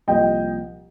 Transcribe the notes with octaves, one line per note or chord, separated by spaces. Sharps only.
C2 A#2 F3 A#3 D#5 G5